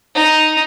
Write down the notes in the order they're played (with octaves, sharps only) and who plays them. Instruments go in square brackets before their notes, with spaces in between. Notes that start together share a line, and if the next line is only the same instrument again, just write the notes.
[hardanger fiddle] D#4